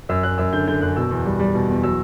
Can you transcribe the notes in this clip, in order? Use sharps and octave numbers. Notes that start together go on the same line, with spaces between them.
F#2 E6
F#2 F#6
F#2 E6
D3 G6
D3 G6
F#2 F#6
B2 E6
E2
G3
G3
B2
E2
F#3 E6